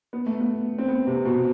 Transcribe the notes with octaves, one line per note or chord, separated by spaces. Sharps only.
B3
A3
B3
C4
B3
C3
B2